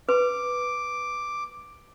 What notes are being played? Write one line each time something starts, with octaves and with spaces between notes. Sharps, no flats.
B4 D6